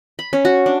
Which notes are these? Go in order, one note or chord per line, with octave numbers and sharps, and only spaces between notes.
B5
C#4
F#4
D4